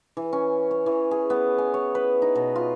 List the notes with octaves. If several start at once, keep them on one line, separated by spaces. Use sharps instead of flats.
E3
C#4
C#5
E3
G#4
B3
G#5
C#5
B4
D#4
B2
F4